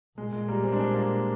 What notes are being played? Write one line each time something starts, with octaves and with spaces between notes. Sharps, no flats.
A#2 G#3
G#3
G3 A#3
G#3 C4
D4
G#3 C4
A#3 D4